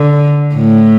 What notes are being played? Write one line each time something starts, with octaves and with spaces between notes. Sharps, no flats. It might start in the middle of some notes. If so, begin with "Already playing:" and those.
Already playing: D3
A2